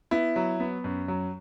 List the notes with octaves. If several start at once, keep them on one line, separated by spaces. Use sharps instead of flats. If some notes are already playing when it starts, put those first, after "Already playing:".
B3 E4
F#3
B3
F#2
F#3